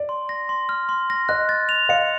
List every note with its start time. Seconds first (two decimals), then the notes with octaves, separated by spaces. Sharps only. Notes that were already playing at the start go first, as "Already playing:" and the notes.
Already playing: D5
0.09 C6
0.29 A#6
0.49 C6
0.69 F6
0.89 C6
1.10 A#6
1.29 D#5 F#6
1.49 A6
1.69 F7
1.89 D#5 F5 C#7